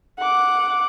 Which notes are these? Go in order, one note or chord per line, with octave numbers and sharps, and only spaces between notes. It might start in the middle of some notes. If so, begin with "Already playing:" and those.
F#5 D6